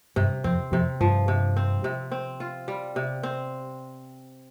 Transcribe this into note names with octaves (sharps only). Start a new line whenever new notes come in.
G2 C3
F2 C4
F2 C3
G2 F3
C3
C4
C3
C4
F4
G3
C3
C4